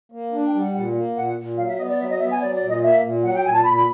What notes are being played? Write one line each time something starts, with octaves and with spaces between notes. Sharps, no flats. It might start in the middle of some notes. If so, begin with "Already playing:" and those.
A#3
D4
G5
G3
F#5
A#2 F#5
A#3
A#2 F#5
A#2
F#3 F5
E5
B3 D#5
D5
F#3 E5
D#5
B3 E5
G#5
F#3 D5
D5
A#2
D#5
A#3 E5
A#2
F#3 F#5
G5
A#2 G#5
A5
A#2 B5
B5